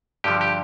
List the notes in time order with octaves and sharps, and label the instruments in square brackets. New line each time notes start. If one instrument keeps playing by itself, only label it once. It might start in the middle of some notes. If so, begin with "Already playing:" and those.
[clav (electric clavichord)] G2 D3 F3 G4
G4